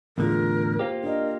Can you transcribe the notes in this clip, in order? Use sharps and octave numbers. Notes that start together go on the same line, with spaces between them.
E2 A2 D3 F4 G#4 A#4
A#3 F4 G4 C5
D4 A#4 D#5